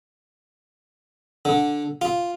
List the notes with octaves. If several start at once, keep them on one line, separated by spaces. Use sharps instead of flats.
D3
F4